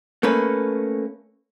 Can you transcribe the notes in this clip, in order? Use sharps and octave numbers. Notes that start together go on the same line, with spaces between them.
A3 A#3 C#4 B4